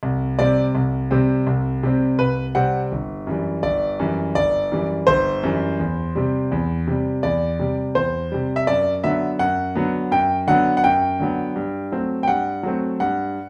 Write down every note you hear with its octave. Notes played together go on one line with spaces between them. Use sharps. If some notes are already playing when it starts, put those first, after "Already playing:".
C2
C3 G3 C4 D5
C2
C3 G3 C4
C2
C3 G3 C4
C2 B4
C3 G3 C4 F#5
G1
F#2 E3 G3
G1 D5
F#2 E3 G3
G1 D5
F#2 E3 G3
G1 C5
F#2 E3 G3
E2
C3 G3
E2
C3 G3
E2 D5
C3 G3
E2 C5
C3 G3
E5
F#2 D5
D3 F#3 B3 E5
F#2 F#5
D3 F#3 B3
F#2 G5
D3 F#3 B3 F#5
F#5
F#2 G5
D3 F#3 B3
G2
F#3 A3 C4
G5
G2 F#5
F#3 A3 C4
G2 F#5